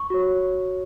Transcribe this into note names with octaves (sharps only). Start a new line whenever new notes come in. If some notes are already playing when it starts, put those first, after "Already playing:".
Already playing: C#6
F#4 C#5